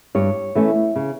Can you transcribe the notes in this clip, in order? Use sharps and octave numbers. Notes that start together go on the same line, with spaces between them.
G2 C#5
E3 A3 C#4
C#3